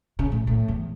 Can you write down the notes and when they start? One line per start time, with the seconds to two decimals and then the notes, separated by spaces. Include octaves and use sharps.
0.19 C#3
0.32 A2
0.47 A2
0.68 E2